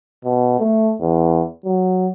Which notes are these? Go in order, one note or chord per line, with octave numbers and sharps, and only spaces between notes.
B2
A3
E2
F#3